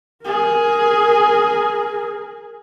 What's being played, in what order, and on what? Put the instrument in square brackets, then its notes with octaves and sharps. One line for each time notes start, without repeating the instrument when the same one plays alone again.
[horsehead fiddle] G#4 A#4